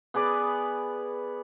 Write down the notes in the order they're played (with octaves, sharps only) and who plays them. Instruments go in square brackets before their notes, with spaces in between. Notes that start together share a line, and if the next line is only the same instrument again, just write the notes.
[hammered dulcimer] B3 G#4 B4 D5